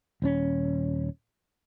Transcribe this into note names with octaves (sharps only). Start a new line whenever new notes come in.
D#1 C4 C#4